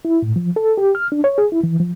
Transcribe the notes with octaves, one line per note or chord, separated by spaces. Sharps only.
E4
A2
F3
A4
G4
F6
D4
C#5
G#4
E4
E3
F3